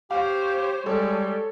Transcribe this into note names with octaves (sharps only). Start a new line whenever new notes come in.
G4 C5 C#5 F5
G3 G#3 A4 C#5